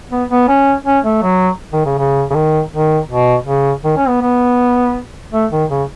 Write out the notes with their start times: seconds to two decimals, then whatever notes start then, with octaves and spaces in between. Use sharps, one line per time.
0.11 B3
0.30 B3
0.48 C#4
0.86 C#4
1.04 A3
1.22 F#3
1.73 D#3
1.86 C#3
1.98 C#3
2.30 C#3
2.35 D#3
2.72 D#3
3.09 B2
3.46 C#3
3.84 D#3
3.97 C#4
4.08 B3
4.21 B3
5.33 A3
5.51 D#3
5.70 C#3